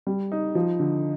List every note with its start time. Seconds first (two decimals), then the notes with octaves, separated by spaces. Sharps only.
0.07 G3
0.32 D#4
0.55 F3
0.80 D3